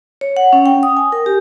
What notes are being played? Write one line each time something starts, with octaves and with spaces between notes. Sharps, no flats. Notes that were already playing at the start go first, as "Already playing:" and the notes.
C#5
F#5
C#4
G5
D#6
G#5
A#4
G4